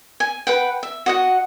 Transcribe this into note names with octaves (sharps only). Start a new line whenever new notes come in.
G#5
B4 F#5 G5
E5
F#4 D#5 F#5